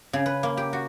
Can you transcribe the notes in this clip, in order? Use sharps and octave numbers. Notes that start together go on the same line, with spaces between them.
C#3
B4
A#3
G4
F#4